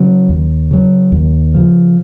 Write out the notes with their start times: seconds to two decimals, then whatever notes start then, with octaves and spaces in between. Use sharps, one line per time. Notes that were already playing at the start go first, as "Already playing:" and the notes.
Already playing: C#3 F#3
0.29 D#2
0.71 C#3 F#3
1.12 D#2
1.54 C#3 F3